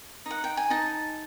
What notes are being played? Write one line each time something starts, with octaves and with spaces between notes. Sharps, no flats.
D#4 F#5
G5
G#5
D#4 A5